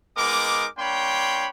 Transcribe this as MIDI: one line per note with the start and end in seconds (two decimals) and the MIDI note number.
0.16 0.65 56
0.16 0.65 59
0.16 0.65 63
0.16 0.65 70
0.16 0.65 86
0.78 1.47 58
0.78 1.47 62
0.78 1.47 73
0.78 1.47 79
0.78 1.47 83
0.78 1.47 84